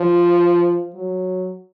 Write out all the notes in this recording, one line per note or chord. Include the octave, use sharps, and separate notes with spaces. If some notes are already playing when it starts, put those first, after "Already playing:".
Already playing: F3
F#3